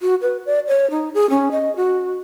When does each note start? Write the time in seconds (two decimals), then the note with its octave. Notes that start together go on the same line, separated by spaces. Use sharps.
0.02 F#4
0.22 B4
0.46 D5
0.68 C#5
0.91 D#4
1.14 G#4
1.30 C#4
1.52 D#5
1.76 F#4